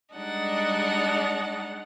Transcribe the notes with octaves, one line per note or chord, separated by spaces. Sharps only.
G3 G#3 D4 D#4 F#5